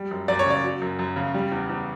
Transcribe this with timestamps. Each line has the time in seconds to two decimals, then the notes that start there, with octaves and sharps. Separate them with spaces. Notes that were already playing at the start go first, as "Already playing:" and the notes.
Already playing: G3
0.11 F#2
0.28 F#2 D5
0.39 C#5
0.46 C#3 D5
0.64 F#3
0.82 F#2
0.99 F#2
1.16 C#3
1.34 G3
1.52 E2
1.69 E2